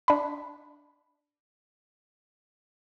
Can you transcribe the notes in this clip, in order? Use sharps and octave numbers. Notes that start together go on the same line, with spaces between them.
D4 B5